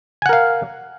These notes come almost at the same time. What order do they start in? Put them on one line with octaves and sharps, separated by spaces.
G#5 F#5 A#4 F5